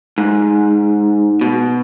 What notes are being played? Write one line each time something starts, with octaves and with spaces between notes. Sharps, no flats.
G#2
B2